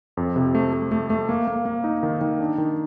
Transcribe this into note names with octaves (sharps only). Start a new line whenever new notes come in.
F2
C3
A3
A3
A3
A3
A#3
A#3
A#3
D#4
D#3
D#3
D4
D#3